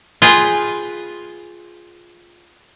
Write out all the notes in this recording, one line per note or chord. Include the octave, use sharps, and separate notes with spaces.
F4 G#4 B4 G5